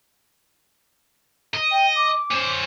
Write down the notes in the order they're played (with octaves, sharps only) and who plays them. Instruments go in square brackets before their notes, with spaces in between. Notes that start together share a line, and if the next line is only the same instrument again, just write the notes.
[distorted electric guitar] D#5
[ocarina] G5
D6
[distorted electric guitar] C#4 C5